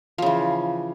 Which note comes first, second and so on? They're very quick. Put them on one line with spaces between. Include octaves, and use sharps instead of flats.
F3 C#3 E3